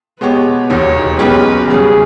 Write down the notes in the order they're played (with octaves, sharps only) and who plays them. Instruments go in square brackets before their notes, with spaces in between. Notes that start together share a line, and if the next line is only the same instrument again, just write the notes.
[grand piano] B2 G#3 B3 G4 C#5 [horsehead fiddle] B4
[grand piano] E1 D#2 D#3 [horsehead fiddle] C#5
[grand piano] B1 B2 G#3 C#4 G4 [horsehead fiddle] B4
[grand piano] E2 C#3 G3 [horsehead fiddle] G#4